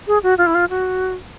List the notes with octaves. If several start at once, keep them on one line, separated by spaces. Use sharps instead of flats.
G#4
F#4
F4
E4
F4
F#4